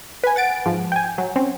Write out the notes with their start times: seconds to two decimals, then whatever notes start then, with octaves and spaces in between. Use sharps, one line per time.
0.24 B4 G#5
0.36 F#5 A6 D7
0.66 G#2 F3
0.92 G5 G#5
1.18 F#3
1.36 C4 C#4